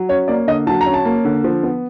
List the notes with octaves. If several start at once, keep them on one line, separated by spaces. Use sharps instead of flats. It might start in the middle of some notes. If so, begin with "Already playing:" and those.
Already playing: F#3
C#4 C#5
A#3 D5
D3 D#5
F#3 A5
A#5
C#4
A5
A#3
D3
F3
B3